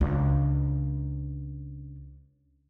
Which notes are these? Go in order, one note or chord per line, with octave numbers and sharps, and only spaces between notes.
C#2 D4